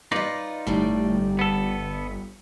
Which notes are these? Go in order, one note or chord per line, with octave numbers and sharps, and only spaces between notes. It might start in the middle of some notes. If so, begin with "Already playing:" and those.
D#4 F4 B4 D5 D#5
G1 A2 G3 D#4 D5
B3 A4